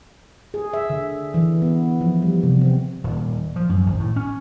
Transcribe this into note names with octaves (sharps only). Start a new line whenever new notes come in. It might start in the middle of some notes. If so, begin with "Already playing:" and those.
G#4
E5
D3
E3
B3
F3
G3
C3
C4
D#1
F3
F#2
G#1
A2
C#4